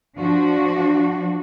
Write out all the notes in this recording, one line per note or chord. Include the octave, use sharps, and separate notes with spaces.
F3 D4 F#4